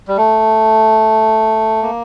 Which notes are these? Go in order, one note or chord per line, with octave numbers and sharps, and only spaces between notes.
G3
A3
A#3